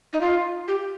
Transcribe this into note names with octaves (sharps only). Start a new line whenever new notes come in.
D#4
F4
G4